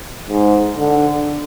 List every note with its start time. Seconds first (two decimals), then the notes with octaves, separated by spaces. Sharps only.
0.29 G#2
0.76 D3